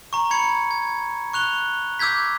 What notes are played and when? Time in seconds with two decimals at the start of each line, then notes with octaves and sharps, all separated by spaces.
0.13 A#5 C#6
0.31 B5 G#6 C#7
0.71 G#6
1.33 C#6 F#6 F7 G7
1.99 D6 E6 G6 G#6 B6